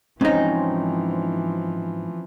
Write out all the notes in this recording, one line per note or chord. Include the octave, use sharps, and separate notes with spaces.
G#2 E3 F3 C4 C#4 D#4